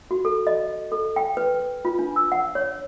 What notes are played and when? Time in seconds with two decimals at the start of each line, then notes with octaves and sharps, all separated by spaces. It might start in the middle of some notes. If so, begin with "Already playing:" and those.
0.11 F#4
0.25 A4
0.47 D#5
0.92 A4
1.16 G5
1.37 B4
1.85 F4
1.99 D4
2.16 E6
2.32 F#5
2.55 C#5